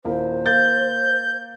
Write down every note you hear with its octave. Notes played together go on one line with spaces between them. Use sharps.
D#1 A#3 E4 C5
A#3 G6 A6